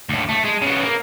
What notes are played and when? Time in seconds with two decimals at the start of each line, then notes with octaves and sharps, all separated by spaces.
0.09 D2 A2
0.29 A3
0.45 G#3
0.62 C#3 B3
0.83 A#3